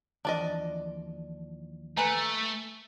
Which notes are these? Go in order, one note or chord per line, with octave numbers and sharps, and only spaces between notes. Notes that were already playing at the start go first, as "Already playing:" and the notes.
D#2 E3 F3 D4 D5 D#5
A3 B4 G#5 A#5